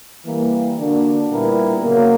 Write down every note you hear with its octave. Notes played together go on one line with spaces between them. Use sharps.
E3 G3 A#3
D3 A#3 D4 F#4 A#4
A#2 G3 B3 E4 A#4
C#3 F#3 A#3